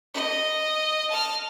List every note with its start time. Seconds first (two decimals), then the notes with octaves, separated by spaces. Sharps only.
0.14 D#5
1.10 A5 F6